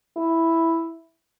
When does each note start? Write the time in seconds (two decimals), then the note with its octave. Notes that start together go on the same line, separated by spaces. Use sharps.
0.17 E4